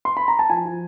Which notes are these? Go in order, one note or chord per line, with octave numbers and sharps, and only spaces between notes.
C6
B5
A#5
A5
F3 G#5
F3